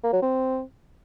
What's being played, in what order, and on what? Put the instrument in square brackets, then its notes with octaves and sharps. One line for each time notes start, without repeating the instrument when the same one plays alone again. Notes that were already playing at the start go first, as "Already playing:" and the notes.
[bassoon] A#3
F#3
C4